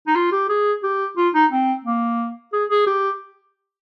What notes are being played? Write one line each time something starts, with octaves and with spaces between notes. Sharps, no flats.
D#4
F4
G4
G#4
G4
F4
D#4
C4
A#3
G#4
G#4
G4